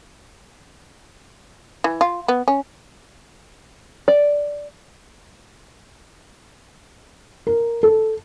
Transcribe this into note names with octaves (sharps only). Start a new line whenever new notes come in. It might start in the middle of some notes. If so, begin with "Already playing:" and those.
E3
F4
B3
C#4
D5
A#4
A4